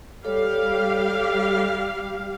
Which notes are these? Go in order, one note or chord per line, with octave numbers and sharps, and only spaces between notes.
G3 G4 A4 C#5 F5